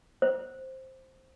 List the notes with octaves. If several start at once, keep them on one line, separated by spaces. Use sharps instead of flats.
C5